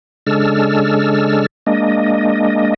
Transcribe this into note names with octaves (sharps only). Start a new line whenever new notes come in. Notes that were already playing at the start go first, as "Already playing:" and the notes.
C#3 G#3 D4 A4 E6 F6
G#3 A#3 D4 D#5